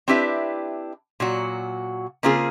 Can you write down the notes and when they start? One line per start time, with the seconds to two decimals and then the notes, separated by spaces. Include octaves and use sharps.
0.08 C4 D4 E4 G4 B4 E5
1.20 A#2 F#3 F#4
2.23 C#3 A#3 C4 F4 G#4